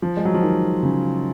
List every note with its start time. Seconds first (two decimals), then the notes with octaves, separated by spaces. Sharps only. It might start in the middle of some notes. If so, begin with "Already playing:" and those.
0.02 F3
0.17 G#3
0.25 F#3
0.34 F3
0.43 D#3
0.83 C#3